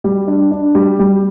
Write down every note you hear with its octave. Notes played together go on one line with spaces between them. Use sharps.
G3
D4
D4
G3
G3